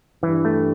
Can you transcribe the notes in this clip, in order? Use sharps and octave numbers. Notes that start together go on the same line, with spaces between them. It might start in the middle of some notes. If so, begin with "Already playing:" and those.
G2 E3
A3